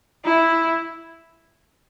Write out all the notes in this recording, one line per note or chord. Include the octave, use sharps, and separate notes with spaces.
E4